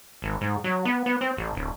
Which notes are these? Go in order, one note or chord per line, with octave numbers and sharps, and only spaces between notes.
G#1
G#2
F#3
B3
B3
C4
A1
D1